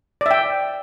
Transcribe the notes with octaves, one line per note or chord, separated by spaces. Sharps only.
D5 E5 G5